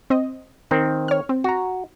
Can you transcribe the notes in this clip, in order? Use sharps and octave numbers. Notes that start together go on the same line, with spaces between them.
C4 D#5
D#3 C4 A#4
C#5 F6
C4
F#4 A#5